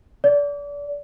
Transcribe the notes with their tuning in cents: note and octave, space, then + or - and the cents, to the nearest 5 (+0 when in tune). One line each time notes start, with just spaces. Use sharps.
D5 -30